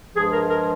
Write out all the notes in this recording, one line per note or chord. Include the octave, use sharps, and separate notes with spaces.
G2 F3 G#3 G#4
A#4
A#4